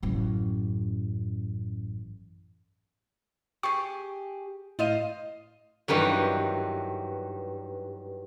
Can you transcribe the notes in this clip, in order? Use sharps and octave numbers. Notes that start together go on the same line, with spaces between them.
A1 F#2
G4 G#4 C#6 C7
A2 C5 D#5 F5 D#7
G2 D#3 E3 F#3